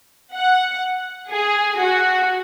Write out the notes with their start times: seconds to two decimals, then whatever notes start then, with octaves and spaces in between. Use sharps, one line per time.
0.33 F#5
1.30 G#4
1.80 F#4